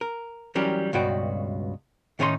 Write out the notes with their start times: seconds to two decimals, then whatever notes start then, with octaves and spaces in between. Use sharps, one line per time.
0.01 A#4
0.55 E3 F#3 G3 C#4 G4 A#4
0.93 C#2 G2 B2 F#4 G5
2.19 A2 D#3 C#4 D#4 C5 C6